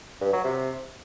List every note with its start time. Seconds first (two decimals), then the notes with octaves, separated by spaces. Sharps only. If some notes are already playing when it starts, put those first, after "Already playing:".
0.21 G2
0.33 F#3
0.44 C3